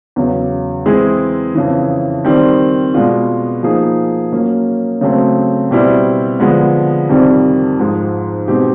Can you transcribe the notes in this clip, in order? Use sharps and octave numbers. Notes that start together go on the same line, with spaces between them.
E2 C#3 F#3
E3 G#3 C4 E4 G#4
F2 C#3 E3
D#3 G3 C4
B2 G#3 B3 D4 F4
F3 A#3 D#4 G#4
F#3 A#3 C#4
C#3 F#3 A3 C4
B2 G3 C4 E4
D3 F3 G#3 B3
F2 C3 D#3 G3
G#2 F3 G#3
B2 G#3 C4 D#4 G4